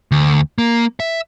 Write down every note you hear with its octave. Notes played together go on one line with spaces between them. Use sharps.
D2
A#3
E5